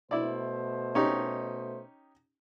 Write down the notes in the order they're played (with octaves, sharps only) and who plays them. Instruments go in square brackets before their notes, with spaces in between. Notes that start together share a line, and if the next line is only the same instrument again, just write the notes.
[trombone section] B2 A3 C5 [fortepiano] E4 D5
[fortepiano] C#4 D#4 G4